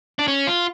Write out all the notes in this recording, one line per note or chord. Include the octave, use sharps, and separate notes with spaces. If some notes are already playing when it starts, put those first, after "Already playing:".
D4
C#4
F4